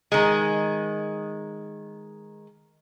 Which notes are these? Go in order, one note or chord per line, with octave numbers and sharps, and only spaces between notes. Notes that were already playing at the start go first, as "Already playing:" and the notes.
D#3 G#3